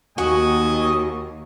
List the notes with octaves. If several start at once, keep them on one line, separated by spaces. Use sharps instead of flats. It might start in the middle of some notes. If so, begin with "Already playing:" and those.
D#2 F#4 D#5 G#5